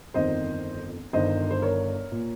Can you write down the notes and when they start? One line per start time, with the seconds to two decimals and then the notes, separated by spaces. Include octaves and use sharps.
0.14 G1 F2 D#3 C5 D#5
1.13 G1 G2 D#3 C5 D#5
1.51 C5
1.62 A#4 C#5
2.12 A#2